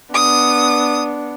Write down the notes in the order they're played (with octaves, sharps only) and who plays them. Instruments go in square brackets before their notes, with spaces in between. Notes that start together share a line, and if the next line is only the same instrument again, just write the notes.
[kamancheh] B3 D4 [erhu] D#6